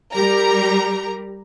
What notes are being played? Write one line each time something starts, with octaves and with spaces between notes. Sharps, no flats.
G3 G4 A#4 A#5